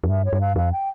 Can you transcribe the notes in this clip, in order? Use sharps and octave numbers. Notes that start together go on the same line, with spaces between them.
F2
G2 E5
C#5
G2
F5
F2 F5
G5